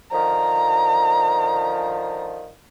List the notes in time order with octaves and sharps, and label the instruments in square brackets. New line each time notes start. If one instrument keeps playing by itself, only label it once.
[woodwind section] D3 D#3 F3 [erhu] A#5